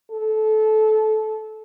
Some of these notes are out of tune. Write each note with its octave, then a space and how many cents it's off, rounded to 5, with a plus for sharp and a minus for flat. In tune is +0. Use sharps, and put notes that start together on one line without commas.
A4 -20